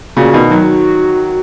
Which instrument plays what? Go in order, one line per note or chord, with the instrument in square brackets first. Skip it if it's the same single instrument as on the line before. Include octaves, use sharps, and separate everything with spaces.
[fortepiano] A#2 C#3 [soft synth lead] F#4
[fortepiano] B2 D#3
D#3 F#3